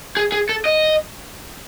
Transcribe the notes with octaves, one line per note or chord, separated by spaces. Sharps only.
G#4
G#4
A4
D#5